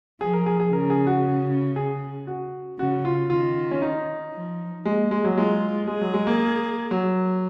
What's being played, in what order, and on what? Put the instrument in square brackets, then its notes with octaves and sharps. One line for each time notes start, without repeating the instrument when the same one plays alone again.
[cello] F3 [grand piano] G#4
[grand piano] A#4
G#4
G#4
[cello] C#3 [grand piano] A#4
[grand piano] G#4
F#4
G#4
F#4
[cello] C#3 [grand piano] F#4
[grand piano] F4
[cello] D#3 [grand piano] F4
[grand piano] C#4
D#4
[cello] F3
[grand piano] G#3 [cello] A#3
[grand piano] G#3
F#3
[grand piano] G#3 [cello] F4
[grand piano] G#3 [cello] G#4
[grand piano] F#3
G#3
A#3
F#3